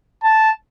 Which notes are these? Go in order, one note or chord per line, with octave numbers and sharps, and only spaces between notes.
A5